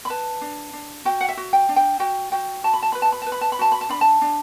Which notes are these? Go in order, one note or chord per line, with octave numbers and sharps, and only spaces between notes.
B5
B4 A5
D4
D4
F#4 G5
F#5
E5
F#4
G5
D4
G5
F#4 G5
F#4 G5
F#4 A5
B5
A5
B4 B5
A5
B5
B4 A5
B5
A5
B5
F#4 A5
B5
A5
D4 B5
A5
D4